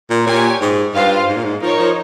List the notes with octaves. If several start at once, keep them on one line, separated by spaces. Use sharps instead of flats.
A#2
A#2 G4 C#5 G#5
G#2
G2 F4 C5 F5
G#2
A#2
G#2
F3 D#4 A#4 C#5
F3